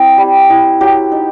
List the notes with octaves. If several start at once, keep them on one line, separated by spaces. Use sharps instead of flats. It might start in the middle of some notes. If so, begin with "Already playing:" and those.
Already playing: C4 E4
G3
E4
F#3 G4
D#4